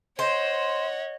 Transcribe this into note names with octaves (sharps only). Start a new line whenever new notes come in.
C5 C#5 D#5 F#5